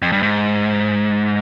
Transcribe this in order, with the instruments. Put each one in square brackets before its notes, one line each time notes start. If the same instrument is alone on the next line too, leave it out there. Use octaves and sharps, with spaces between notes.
[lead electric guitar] F2
G2
G#2